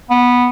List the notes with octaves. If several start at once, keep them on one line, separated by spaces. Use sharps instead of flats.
B3